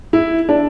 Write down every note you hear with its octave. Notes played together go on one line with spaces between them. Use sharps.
E4
D4